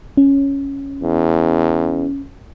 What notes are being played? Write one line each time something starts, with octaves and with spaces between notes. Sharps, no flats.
C#4
E2